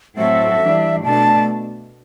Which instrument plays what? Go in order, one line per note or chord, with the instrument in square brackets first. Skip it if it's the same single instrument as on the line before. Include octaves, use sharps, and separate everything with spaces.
[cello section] A2 F#3 C4 F#4 A4 [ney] E5
[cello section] E3 G3 D4
[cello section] B2 A3 D4 [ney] A5